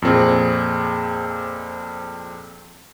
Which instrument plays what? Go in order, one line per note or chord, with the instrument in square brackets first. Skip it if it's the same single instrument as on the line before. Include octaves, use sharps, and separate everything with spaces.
[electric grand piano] F2 A#2 C4 G#4